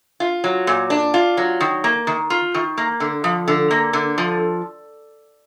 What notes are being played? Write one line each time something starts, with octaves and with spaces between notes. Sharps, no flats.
F4
F#3
A#2
D4
F4
F#3
D#3
A#3
D#3
F4
D#3
A#3
D3
F3
D3
A#3
D3
F3